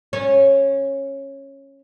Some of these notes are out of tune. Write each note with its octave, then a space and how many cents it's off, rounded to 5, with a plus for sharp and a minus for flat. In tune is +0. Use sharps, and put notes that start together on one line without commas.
C#4 -15